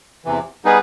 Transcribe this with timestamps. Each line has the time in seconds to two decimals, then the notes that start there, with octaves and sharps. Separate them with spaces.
0.25 E2 C3 E3
0.65 G3 B3 D#4 G#4 B4